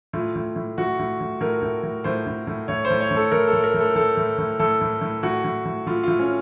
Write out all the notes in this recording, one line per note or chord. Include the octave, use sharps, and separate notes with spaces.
A2 F4
A2
A2
A2 F#4
A2
A2
A2 A#4
A2
A2
A2 C5
A2
A2
A2 C#5
C5
A2
C#5
A2
A4
A2 A#4
A4
A2
A#4
A2
A4
A2 A4
A2
A2
A2 A4
A2
A2
A2 F#4
A2
A2
A2 F4
A2 F4
C#4